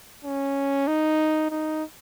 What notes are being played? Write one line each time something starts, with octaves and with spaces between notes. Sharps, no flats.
C#4
D#4
D#4